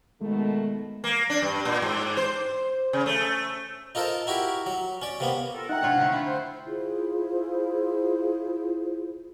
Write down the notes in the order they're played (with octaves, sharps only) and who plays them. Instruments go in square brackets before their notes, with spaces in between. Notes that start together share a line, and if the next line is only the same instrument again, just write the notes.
[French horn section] B2 D#3 A3 [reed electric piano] G#3
[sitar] A#3
D4
G2
A#2
G#2
C5
C#3
A3
[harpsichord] D#4 F4 A4 A#4 C5
E4 F#4 G4 A#4
F#3
C#4 D5
C3 A#3 B3
[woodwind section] F4 A4 A#4
[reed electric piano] D#4 E5 A#5 [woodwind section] F#5 [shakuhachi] G5
[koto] C3 F4 C#5 [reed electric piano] D4
[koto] D3 A3
E4 F4
[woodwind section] C5
[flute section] E4 F4 G#4 C5